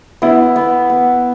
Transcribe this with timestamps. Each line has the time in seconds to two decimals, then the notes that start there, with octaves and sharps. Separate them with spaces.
0.22 B3 E4
0.56 B3
0.90 B3